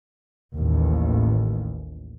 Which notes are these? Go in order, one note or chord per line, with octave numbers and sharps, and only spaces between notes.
A1 D#2